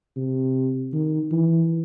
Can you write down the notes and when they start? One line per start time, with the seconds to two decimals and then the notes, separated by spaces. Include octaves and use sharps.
0.16 C3
0.93 D#3
1.32 E3